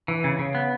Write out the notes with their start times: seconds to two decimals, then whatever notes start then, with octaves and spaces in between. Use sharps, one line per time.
0.08 E3
0.24 C#3
0.39 C#3
0.55 B3